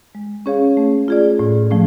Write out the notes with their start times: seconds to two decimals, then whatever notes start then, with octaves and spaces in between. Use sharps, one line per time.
0.15 G#3
0.46 C#4 G#4 C#5 F5
0.77 A3
1.08 F4 G#4 D5
1.39 A2
1.70 F3 A3 C#4